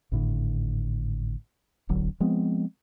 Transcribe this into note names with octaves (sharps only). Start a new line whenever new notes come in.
G#1 A2 D3
D1 G1 D3 F#3
F3 G#3 B3 C4